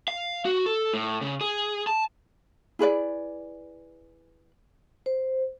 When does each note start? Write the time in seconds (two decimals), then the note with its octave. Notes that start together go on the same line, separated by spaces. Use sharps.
0.08 F5
0.45 F#4
0.66 A4
0.93 A2
1.22 C#3
1.41 G#4
1.87 A5
2.79 E4 G#4 B4 D5
5.06 C5